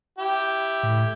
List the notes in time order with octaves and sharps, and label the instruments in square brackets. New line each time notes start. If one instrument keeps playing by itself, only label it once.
[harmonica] E4 G4
[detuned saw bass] A2